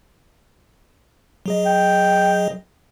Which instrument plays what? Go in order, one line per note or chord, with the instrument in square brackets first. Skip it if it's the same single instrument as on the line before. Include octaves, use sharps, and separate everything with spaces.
[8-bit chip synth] F#3 G#4 D#5
[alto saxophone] G5